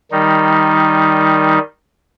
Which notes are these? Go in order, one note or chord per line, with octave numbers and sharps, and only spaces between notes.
D#3 G3 D#4